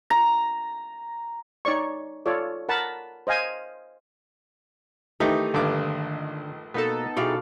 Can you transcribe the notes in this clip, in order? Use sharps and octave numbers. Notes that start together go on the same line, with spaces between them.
A#5
D#4 C#5 D5 C#6
F4 A4 C#5 D5
A#4 F#5 A5 B5
C5 D#5 F5 G#5
D#3 E3 A3 D#4 G4
A#1 G2 D3 D#3 D6
B2 A#3 B3 D#4 A4 A#5
B2 E4 G4 G#4 D5 F5